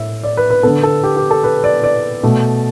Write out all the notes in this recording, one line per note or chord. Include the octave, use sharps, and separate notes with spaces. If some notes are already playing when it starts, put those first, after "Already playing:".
Already playing: A2 E5
D5
B4
B4
D3 B3 A4
A4
G4
G4
A4
B4
D5
D5
B2 A3